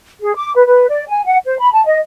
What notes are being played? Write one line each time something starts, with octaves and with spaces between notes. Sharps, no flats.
G#4
D6
B4
B4
D5
G#5
F#5
C5
B5
A5
D#5